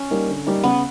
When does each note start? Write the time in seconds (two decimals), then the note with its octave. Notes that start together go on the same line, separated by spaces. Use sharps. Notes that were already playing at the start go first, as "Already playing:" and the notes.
Already playing: C#4
0.10 G3 A#3 D#4
0.29 D3
0.46 G3 A#3 D#4
0.63 C#3 B3